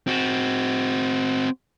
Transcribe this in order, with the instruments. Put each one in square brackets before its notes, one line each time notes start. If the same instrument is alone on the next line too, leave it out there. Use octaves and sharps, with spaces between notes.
[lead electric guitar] C4 F#4